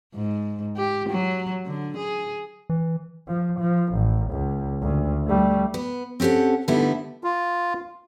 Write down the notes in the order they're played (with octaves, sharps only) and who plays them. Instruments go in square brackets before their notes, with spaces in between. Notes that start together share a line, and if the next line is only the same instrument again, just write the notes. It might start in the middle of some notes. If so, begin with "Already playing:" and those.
[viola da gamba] G#2
G4
F#3
D3
G#4
[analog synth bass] E3
[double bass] F3
F3
A1
C#2
D2
G3 A3
[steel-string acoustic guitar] B3
C4 C#4 G4 A4 F#5
D3 G3 A3 B3 D#4 E4
[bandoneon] F4